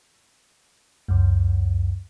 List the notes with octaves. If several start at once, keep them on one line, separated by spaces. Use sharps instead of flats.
C#2 F#2